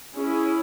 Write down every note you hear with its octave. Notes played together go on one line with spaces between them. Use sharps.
C#4 E4 G#4